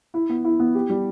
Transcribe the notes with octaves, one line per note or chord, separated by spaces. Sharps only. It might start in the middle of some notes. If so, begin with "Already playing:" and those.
E4
B3
E4
B3
G4
G3